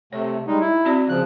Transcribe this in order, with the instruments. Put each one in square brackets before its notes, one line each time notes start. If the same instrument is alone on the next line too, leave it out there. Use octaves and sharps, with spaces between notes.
[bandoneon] C3 A3 [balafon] C#5
[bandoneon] G3 G#3 D#4
E4
[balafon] C4 F#4 D5
[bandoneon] C#3 F3 F#6